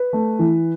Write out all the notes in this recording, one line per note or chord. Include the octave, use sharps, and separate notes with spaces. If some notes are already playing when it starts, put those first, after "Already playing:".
Already playing: B4
A3
E3